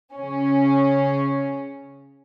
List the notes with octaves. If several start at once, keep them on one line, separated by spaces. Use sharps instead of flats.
C#3 C#4